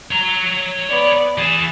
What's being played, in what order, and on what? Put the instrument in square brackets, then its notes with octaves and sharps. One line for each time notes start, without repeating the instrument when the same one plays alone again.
[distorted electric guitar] C#5 A#5
[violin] B3 D5
[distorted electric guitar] E3 G#4 [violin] A6 E7